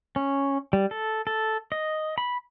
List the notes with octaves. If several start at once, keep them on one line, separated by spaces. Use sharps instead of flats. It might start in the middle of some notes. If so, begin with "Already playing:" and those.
C#4
G3
A4
A4
D#5
B5